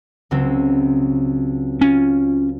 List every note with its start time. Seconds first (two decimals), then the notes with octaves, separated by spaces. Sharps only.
0.31 C#2 F#3 C4
1.81 C#4 F4